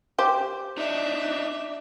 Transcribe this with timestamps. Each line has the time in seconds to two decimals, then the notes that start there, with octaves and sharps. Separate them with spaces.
0.18 G4 C5 D6
0.77 D4 D#4 E5